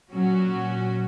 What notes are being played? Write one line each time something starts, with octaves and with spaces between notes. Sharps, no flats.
A#2 F#3 C#4 F#4